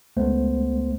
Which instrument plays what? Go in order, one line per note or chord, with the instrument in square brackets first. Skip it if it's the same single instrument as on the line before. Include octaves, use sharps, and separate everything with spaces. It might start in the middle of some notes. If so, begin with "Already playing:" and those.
[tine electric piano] C#2 A3 B3 C5